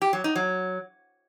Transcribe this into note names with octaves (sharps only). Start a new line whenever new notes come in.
G4
F#3
D#4
F#3